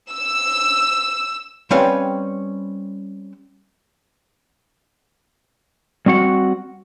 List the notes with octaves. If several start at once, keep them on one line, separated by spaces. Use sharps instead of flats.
E6
G3 C4 C#4 B4 F5
G3 C4 F#4 F#5